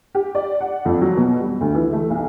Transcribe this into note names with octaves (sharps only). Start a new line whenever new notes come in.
G4
D5
F#5
F2
F#3
B2
G3
D2
E3
A3
B1